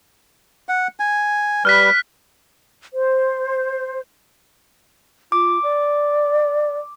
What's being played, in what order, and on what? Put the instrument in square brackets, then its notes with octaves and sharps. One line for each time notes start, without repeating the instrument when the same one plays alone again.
[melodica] F#5
G#5
[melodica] G3 B4 [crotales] F6 F#6 B6
[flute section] C5
[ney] F4 [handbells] D6
[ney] D5